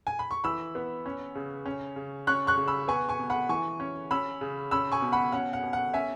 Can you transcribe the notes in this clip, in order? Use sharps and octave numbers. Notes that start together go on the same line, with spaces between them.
G#5
B5
C#6
E3 B5 E6
B3
C#4
C#3
C#4
C#3
C#4 C#6 F#6
C#6 F#6
C#3
B5 E6
B3 G#5 C#6
G#5 C#6
B2
F#5 B5
E3 G#5 C#6
C#4
C#4 B5 E6
C#3
C#4 B5 E6
G#5 C#6
B2
F#5 B5
C#4 F#5
F#5
B2
F#5
C#4 E5 G#5